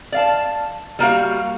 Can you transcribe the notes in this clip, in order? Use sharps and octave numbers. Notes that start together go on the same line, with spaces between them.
D5 F5 A5
G3 A#3 F#4 F5